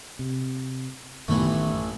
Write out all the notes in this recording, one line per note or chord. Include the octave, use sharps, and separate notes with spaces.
C3
A1 F#2 D#3 E3 A3 B3